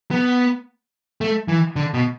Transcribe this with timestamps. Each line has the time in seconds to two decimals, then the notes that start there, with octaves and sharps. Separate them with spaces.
0.11 B3
1.21 A3
1.48 E3
1.76 D3
1.94 B2